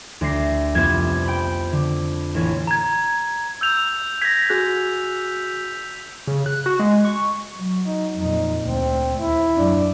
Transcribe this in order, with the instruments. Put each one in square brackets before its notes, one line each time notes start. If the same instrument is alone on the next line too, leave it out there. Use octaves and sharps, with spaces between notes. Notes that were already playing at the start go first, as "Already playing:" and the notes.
[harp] D2 A#6 C7
C2 F2 B3 G#6 E7
G5 B5
D3
A1 A#3 C#5 B6
[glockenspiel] A#5 G#6
[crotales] E6 G6 F7
[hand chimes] G#6 A#6 [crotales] B6
[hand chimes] F#4 G#4 F#6
[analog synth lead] C#3
F#6
F#4
G#3
C#6
[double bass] F#3
[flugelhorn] D#4
[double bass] F2 A#2 [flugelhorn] D#4
[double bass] D2 [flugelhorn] C4
[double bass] D#2 [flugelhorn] E4
[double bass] F#2 D4